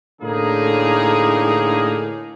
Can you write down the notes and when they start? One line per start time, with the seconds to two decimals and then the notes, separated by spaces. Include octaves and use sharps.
0.22 A2 D3 A#3 D#4 G#4